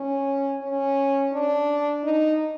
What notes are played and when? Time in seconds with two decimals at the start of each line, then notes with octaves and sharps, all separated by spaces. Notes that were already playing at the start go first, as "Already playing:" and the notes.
Already playing: C#4
0.62 C#4
1.33 D4
2.04 D#4